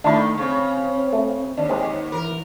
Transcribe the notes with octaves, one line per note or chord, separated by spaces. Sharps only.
D#3 A3 D4 E4
C#3 C4
A3
D#2 D4
G#3 C4
E3 A#4